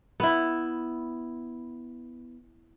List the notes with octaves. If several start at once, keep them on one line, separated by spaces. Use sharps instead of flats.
B3 E4